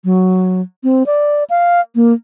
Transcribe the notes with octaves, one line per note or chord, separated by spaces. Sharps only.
F#3
C4
D5
F5
A#3